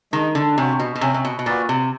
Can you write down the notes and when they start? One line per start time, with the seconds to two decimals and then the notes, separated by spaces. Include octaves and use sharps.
0.12 D#3 G#3
0.35 D3
0.57 C3 C#4 F#4
0.79 B2
0.95 B2
1.01 C3 C#4
1.14 C3
1.25 B2
1.39 B2
1.46 A#2 F#4 B4 D5
1.69 C3